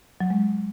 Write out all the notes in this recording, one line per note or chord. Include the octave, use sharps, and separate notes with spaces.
F#3
G#3